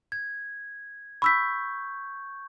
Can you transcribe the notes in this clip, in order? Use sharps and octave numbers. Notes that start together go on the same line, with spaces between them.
G#6
B5 C#6 E6 G6 B6